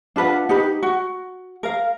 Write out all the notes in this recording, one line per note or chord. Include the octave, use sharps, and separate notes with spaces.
D4 F4 B4 F#5
D#4 G4 B4
F#4
A#4 F5